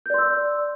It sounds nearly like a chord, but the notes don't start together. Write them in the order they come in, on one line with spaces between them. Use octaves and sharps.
G6 D5 C6 E6